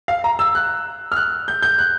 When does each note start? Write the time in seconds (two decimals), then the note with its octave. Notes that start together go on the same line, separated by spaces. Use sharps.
0.08 F5
0.24 A#5
0.39 E6
0.55 F#6
1.12 F6
1.16 F#6
1.48 G6
1.62 G6
1.78 F#6